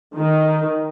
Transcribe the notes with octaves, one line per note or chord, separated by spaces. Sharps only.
D#3